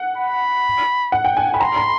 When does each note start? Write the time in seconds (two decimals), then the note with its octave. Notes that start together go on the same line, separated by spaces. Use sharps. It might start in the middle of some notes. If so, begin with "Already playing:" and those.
Already playing: F#5
0.18 B5
1.12 F#5
1.25 G5
1.37 G#5
1.54 B5
1.60 A#5 C6
1.76 B5